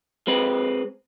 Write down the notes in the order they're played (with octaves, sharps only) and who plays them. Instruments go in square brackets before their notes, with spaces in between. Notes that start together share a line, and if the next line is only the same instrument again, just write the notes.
[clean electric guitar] G#3 C4 B4